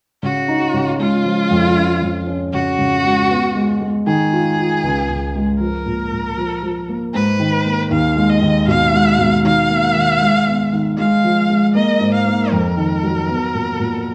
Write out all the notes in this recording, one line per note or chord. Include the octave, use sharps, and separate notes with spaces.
C#3 F#4
D#4
C#3
G#3 F4
F3
F2
C#4
F2
C#4
C#3 F#4
C#3
G#3
B3
G#3
G#3
D#3 G#4
F4
F4
C#2
C#2
G#3
F3 A#4
A#2
A#2
F3
F3
A#3
G#2 B4
D#3
A#3
D#2 F5
G#3
D#5
D#2
B2 F5
G#3
B2
D#3 F5
A#3
D#3
G#3
B3
D#3
G#3 F5
F3
G#3
A#3 D#5
G#2
F5
A#3
F2 A#4
D#3
F#3
B3
A#2
A#2